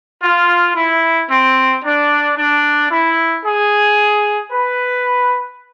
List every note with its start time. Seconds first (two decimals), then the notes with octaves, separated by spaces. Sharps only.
0.22 F4
0.75 E4
1.29 C4
1.84 D4
2.37 D4
2.90 E4
3.44 G#4
4.51 B4